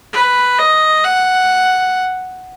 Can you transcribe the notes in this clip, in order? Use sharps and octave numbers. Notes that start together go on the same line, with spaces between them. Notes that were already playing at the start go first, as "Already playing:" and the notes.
B4
D#5
F#5